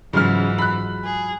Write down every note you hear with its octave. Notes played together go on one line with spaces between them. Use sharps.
G#2 C#3 E3 F#3 G#3 F4 F6
B5 F#6
G#4